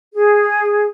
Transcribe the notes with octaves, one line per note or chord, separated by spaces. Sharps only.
G#4